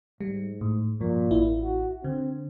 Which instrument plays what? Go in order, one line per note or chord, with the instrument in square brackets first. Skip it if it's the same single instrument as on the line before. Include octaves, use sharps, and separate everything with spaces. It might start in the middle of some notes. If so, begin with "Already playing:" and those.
[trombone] G#2 [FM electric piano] G3
[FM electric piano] A2
[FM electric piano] G2 F3 [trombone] A#2
[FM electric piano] A1 E4
[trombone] F#4
[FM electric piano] D3 [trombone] C4